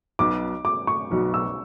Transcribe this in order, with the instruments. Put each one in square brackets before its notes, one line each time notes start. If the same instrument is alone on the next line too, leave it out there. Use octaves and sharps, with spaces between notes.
[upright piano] B1 B2 F#3 B3 [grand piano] D6
[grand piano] D6
C#6
[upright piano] B1 B2 F#3 B3
[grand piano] E6